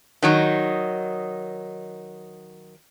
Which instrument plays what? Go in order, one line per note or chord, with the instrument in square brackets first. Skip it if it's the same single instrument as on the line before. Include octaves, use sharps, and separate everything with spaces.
[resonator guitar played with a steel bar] D#3 F#3 D#4